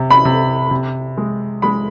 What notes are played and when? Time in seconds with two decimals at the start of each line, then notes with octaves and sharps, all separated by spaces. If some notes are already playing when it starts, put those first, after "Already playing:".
Already playing: C3
0.11 B5
0.25 C3
0.71 C3
1.17 G#3
1.62 G#3 B5